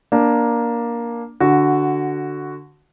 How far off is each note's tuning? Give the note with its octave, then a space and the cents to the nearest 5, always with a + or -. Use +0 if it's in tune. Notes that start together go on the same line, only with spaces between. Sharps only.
A#3 +10 D4 +0
D3 +0 F#4 +0